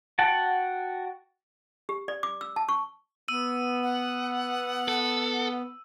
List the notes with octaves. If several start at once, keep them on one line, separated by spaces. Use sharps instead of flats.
F#4 F#5 G5 A5
G4
D5
D6
E6
A5
C#6
B3 E6 D#7
F#5
A4